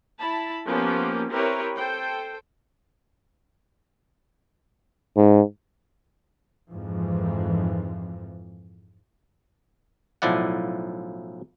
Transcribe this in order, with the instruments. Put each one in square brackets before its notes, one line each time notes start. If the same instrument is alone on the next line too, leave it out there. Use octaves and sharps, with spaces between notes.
[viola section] E4 A5 B5
F3 A#3 B3 C#4 G4
C4 E4 G4 A#4 B4 C#5
A4 C5 G5
[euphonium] G#2
[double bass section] F2 G#2 E3 F3
[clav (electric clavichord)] B1 A2 F3 E4 D5 F#5